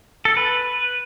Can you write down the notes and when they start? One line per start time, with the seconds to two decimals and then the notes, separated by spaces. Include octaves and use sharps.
0.25 A4
0.37 B4